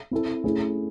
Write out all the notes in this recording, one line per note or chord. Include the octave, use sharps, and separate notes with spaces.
C4 E4 A4
A3 C#4 E4 G#4